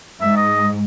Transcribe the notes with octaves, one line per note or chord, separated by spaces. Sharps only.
G#2 E5
D#5